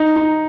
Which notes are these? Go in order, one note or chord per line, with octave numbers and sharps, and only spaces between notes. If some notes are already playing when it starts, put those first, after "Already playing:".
Already playing: D#4
D#4